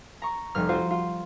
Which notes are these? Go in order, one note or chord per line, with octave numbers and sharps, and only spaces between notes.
A#5 C#6
F1 G3 F6
F4 F#4 C5
F4